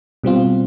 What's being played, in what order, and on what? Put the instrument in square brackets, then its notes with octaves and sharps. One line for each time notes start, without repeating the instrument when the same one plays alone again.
[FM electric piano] B2 G3 C4 F4